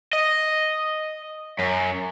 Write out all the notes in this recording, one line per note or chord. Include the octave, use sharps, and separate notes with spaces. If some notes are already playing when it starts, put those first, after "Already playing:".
D#5
F#2